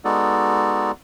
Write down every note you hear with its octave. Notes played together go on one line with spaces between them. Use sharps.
G#3 B3 D#4 F#4 A4 D5